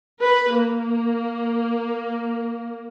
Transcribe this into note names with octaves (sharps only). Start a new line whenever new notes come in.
B4
A#3